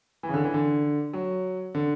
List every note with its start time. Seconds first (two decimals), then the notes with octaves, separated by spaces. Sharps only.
0.23 E3
0.28 C#3
0.34 D3
0.44 E3
0.54 D3
1.13 F#3
1.75 D3